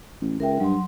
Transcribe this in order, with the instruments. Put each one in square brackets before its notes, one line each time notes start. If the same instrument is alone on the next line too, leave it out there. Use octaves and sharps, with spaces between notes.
[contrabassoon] A1
[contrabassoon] C#2 [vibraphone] A#4 E5 G5
[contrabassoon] G2 [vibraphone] F#3 C6